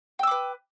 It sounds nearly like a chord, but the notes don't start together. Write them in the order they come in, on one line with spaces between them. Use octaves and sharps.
G5 E6 D6 B4